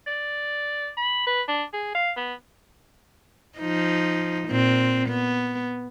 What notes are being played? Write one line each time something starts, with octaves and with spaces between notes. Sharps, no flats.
D5
B5
B4
D4
G#4
F5
B3
F3 D#4
A#2 C4
B3